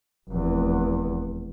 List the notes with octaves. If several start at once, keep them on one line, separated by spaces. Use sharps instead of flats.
F1 E2